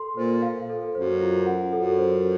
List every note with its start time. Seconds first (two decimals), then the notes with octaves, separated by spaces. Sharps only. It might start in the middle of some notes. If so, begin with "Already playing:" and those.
Already playing: A4 C6
0.17 A#2 C5
0.42 F5
0.70 A4
0.95 F#2 C5
1.21 F4
1.46 F#5
1.72 F#2 A4
1.99 C5